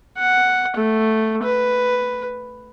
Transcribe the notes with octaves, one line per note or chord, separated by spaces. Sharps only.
F#5
A3
B4